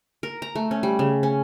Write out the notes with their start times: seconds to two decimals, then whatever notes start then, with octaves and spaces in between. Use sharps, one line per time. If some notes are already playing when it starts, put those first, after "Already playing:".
0.23 A#4
0.42 A#5
0.55 A3
0.71 C#4
0.83 G3
0.99 C#3
1.23 C#4